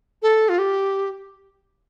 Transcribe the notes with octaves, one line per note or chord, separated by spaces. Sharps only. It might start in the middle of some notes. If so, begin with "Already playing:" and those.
A4
F4
G4